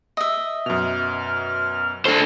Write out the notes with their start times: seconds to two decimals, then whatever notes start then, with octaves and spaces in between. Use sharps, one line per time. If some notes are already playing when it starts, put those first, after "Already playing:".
0.17 D#5 E5
0.66 F#2 B2 F6
2.05 D4 A4 C5 C6